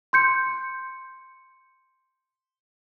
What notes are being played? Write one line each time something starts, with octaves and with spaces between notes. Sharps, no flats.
C6 G6 C#7